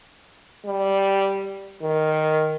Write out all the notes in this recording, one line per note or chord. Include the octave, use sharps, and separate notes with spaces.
G3
D#3